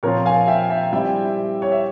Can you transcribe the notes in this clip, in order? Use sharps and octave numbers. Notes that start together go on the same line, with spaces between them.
A#2 F3 C4 F4 A#4 C#5
F5 G#5
E5 G5
E5 G5
G3 C4 E4 E5 G5
C#5
E5